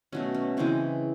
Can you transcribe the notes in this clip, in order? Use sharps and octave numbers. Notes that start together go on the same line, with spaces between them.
B2 F#3 A3 C#4
C#4
C#3 E3 G#3 C4